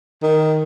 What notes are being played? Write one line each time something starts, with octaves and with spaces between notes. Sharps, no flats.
D#3